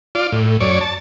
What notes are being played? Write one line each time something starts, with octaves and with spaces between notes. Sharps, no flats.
F4 D5
A2
F#2 C#5 D5
A5